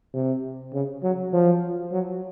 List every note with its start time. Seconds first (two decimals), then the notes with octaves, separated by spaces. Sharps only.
0.14 C3
0.73 C#3
1.03 F#3
1.33 F3
1.92 F#3